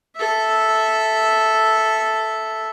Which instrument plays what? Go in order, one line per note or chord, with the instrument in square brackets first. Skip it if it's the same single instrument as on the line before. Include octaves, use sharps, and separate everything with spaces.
[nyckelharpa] A4 E5